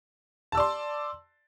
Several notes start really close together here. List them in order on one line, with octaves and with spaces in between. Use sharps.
A5 E6 D5 C6